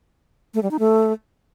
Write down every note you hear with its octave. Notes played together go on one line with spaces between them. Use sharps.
A3
G3
D#4
A3